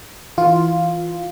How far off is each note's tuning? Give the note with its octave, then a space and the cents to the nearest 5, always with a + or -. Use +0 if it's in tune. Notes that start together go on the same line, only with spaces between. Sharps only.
E3 +0 F4 +0